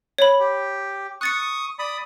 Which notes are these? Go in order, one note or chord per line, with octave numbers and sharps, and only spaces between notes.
C#5 B5
G4
C#6 D#6 F#6 A6 C#7
D5 B5 D#6